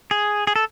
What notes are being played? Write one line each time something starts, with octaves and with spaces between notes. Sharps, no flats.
G#4
G#4
A4